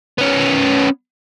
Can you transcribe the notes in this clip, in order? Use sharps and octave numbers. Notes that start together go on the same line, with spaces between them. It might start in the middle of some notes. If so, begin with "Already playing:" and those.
B3 C#4